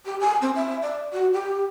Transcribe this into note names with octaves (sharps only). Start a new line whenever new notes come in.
G4
G#5
C4
E5
D5
F#4
G4